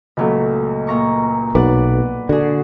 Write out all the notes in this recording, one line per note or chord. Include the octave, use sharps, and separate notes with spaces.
C#2 A#2 F#3 A3 B5
A#2 A#5 C#6
B1 B4 D5 F#5
D3 F#4 G#4